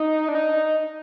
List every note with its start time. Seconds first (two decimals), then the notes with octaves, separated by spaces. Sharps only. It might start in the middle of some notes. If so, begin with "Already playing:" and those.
Already playing: D#4
0.28 D4
0.35 D#4